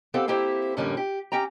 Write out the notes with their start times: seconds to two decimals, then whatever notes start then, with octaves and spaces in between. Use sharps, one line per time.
0.14 B3 C4 G4 A4 C5 F5
0.28 A#3 C4 E4 G4 A4 C5
0.77 F2 A2 D3 G3 A#3 C#4
0.97 G4
1.32 C#4 G4 G5 A#5